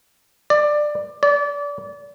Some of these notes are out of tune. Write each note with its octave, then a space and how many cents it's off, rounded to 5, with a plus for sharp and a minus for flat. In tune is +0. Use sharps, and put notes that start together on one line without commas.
D5 +15
D5 -30